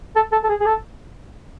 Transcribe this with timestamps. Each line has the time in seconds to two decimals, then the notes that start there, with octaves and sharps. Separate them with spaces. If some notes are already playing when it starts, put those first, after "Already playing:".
0.16 A4
0.32 A4
0.44 A4
0.49 G#4
0.61 G#4
0.66 A4